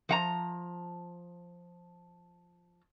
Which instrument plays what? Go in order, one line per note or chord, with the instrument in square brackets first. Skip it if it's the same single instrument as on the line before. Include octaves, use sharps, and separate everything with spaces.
[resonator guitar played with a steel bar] F3 F#5 A#5